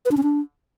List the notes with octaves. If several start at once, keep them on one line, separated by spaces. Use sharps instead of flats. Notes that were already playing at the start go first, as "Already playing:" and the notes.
B4
D4
C#4
D4